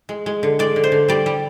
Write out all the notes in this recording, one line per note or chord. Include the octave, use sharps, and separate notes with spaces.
G#3
G#3
D3
G#3 D5
D3
C5
D3
G3 D5
G3